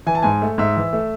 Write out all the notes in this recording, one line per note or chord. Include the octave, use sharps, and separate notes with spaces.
E3 G#5
A5
G#2 G#5
A3
G#2 E5
E3
A3